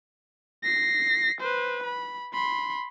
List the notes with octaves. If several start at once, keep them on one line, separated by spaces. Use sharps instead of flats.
A#6 C7
B4 C5
B5
B5 C6